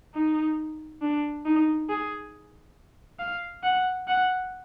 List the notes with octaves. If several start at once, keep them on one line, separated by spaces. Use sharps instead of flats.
D#4
D4
D#4
G#4
F5
F#5
F#5